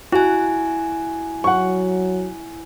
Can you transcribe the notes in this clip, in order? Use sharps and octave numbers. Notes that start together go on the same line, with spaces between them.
E4 F#4 G#5
F#3 F#5 C#6